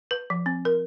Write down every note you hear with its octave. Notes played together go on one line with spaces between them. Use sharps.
B4
F3
C4
A#4